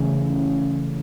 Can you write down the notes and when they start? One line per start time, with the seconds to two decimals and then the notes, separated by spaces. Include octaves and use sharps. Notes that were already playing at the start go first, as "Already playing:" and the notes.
Already playing: C#3 E3 A3 C#4